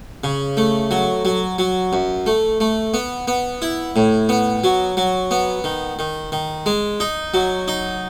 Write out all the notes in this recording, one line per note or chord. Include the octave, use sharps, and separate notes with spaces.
C#3
A3
F#3
F#3
F#3
F#2
A3
A3
B3
B3
E4
A2
B3
F#3
F#3
B3
D#3
D#3
D#3
G#3
D#4
F#3
D#4